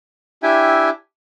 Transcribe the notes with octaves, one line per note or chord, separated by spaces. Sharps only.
D4 E4 G4 E5 G5 G#5